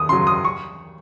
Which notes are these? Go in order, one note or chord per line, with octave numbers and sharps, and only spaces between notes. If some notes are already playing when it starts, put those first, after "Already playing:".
Already playing: D#2 D#6
C#3 F#3 C6
D#6
C#6